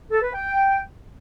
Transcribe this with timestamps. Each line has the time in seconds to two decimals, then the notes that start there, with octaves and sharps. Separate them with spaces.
0.10 A4
0.22 B4
0.34 G5